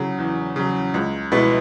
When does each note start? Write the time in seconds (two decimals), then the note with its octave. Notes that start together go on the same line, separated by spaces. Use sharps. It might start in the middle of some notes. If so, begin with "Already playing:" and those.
Already playing: C#3 F#3
0.18 E2
0.56 C#3 F#3
0.94 C#2
1.32 B2 G#3 B3 E4